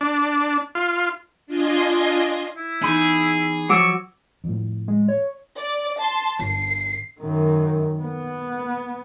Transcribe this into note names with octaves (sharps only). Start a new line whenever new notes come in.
D4
F4
D4 F4 D#5 G#5 C6
E4
E2 D#4 G#4 B5
F3 F#3 C#6 D6 E6
F2 A2
G#3
C#5
D5
A5 C6
G1 C7
F#2 D#3
B3